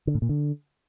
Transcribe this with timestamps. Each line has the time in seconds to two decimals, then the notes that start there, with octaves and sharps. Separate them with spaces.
0.07 D3
0.15 A2
0.22 A#2
0.29 D3